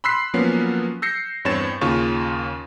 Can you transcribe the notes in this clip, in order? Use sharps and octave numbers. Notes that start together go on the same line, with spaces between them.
B5 C6 E6 F#6 B6 C7
F3 F#3 A#3 B3 C#4
E6 G6 A#6 C7 C#7
E2 G2 C4 C#5 A6 E7
D#2 C#3 F4 C#6